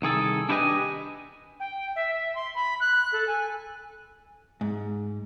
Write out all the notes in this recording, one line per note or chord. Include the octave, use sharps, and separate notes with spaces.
C2 D#3 G#4 A4
D4 E4 G4 B4 D#5 G#5
G5
E5
E5
C6
B5
F#6
A4
G#5
G#2